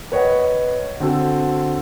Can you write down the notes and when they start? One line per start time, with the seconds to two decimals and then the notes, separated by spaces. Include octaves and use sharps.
0.12 B4 C#5 D#5 F#5
1.00 D3 C4 F#4 A4